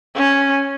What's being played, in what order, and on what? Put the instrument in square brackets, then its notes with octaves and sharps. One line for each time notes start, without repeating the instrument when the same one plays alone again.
[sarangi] C#4